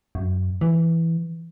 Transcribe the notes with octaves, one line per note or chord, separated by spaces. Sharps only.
F#2
E3